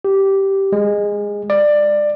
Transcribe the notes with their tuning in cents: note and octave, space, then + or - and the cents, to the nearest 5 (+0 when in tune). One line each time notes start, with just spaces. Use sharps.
G4 -10
G#3 -15
D5 +15